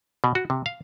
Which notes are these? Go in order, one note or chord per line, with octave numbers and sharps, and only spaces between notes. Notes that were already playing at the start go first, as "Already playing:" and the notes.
B2
F#4
C3
F5